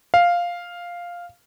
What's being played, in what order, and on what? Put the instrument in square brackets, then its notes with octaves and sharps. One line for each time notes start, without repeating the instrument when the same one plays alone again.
[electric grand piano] F5